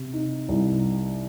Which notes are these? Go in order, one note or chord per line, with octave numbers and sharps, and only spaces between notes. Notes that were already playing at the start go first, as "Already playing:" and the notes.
Already playing: C3
D#4
C2